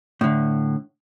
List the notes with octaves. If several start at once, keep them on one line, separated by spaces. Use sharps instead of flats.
A2 D3